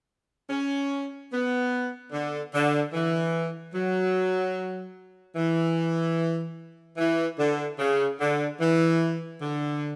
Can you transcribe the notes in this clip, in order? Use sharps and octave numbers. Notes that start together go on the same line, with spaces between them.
C#4
B3
D3
D3
E3
F#3
E3
E3
D3
C#3
D3
E3
D3